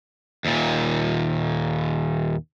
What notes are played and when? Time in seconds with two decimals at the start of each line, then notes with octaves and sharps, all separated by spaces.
0.45 D#2 A#2